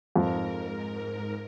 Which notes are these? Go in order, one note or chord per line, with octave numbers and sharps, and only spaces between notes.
F2 G#2 A#4